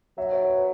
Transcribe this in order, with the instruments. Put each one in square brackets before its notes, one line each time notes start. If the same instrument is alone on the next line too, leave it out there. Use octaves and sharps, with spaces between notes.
[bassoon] F#3 [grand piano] E5
[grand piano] C#5
B4
B4